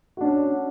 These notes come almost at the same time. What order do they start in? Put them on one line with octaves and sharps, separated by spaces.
F#4 D4 C#4